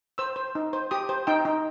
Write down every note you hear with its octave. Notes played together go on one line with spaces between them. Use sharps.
C5 E6
C5
D#4
C5
G4 D#6
C5
D#4 G5
D#4